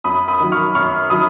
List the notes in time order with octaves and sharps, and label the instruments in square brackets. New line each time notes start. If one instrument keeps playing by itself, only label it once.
[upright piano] F#2 B5 D#6
B5 D#6
D#3 F#3
C#6 F6
F#2 C#6 F6
D#3 F#3 B5 D#6